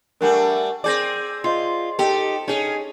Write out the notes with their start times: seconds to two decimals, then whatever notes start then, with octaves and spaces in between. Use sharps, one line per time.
0.21 G3 A3 D4 A#4 F#5 G#5
0.84 C4 G#4 D5 D6 G6 A#6
1.44 F4 C5 D#5 C6
1.99 D#4 G4 A4
2.48 C#4 D#4 G#4